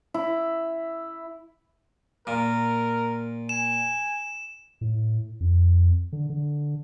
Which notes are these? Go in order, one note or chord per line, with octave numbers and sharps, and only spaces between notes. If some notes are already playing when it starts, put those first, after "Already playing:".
E4
A#2 A#4
G#5 E7
A2
F2
D3
D3